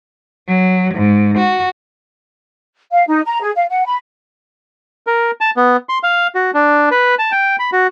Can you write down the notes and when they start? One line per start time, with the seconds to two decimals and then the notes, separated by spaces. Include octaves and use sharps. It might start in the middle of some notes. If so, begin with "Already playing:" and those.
0.48 F#3
0.94 G#2
1.38 F#4
2.92 F5
3.08 D#4
3.25 A#5
3.42 G#4
3.56 F5
3.69 F#5
3.86 B5
5.07 A#4
5.41 A5
5.57 B3
5.89 C6
6.03 F5
6.35 F#4
6.54 D4
6.91 B4
7.19 A5
7.32 G5
7.59 B5
7.72 F#4